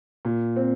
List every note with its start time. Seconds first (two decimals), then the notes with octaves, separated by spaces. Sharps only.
0.25 A#2
0.56 C4